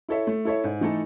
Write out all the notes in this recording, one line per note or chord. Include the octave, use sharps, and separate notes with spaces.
E4 A4 C#5 E5
A3
E4 A4 C#5 E5
G#2
E3 A3 D#4 A4